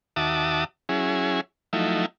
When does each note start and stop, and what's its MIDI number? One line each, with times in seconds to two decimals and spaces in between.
0.16 0.64 39
0.16 0.64 66
0.16 0.64 76
0.16 0.64 81
0.16 0.64 86
0.16 0.64 87
0.89 1.41 54
0.89 1.41 61
0.89 1.41 64
0.89 1.41 68
1.73 2.06 53
1.73 2.06 54
1.73 2.06 57
1.73 2.06 63
1.73 2.06 64